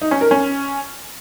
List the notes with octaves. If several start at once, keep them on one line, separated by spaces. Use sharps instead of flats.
D#4
C#4
A#4
C#4